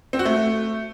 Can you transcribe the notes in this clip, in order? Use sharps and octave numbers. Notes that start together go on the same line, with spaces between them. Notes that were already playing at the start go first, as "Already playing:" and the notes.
C4
F#4
A3